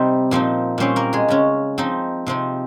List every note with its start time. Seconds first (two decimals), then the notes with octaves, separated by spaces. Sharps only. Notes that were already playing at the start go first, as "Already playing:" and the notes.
Already playing: C3 G3 C4 D#4 D#5
0.31 A#2 F3 C4 D#4
0.78 A#2 G3 C4 C#4 C5
0.96 A#3 A#4
1.13 G#3 G#4
1.28 C#3 G#3 C#4
1.78 F3 C4 D#4
2.27 C3 F3 C4 D#4